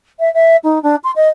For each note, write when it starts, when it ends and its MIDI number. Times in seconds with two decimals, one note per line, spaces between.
0.20 0.32 76
0.34 0.57 76
0.64 0.82 63
0.83 0.96 62
1.04 1.11 84
1.16 1.29 75